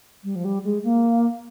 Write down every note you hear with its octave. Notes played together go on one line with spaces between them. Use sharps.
G3
F3
G3
G#3
A#3